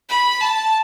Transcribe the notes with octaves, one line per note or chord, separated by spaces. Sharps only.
B5
A5